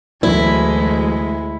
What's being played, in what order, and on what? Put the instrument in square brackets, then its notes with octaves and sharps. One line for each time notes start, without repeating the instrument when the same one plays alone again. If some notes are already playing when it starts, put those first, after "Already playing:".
[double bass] D2 [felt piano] E3 F#3 [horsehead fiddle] G#3 [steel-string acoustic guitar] E4